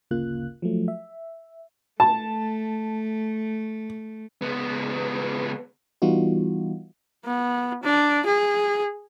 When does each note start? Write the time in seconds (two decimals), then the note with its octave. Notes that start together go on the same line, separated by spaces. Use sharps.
0.11 G1 D2 C#3 A#3 F4 F#6
0.62 F3 F#3 A3
0.88 E5
2.00 A3 A5
4.42 C#2 B3
6.02 E3 G3 B3 D#4 F4 F#4
7.25 B3
7.83 D4
8.26 G#4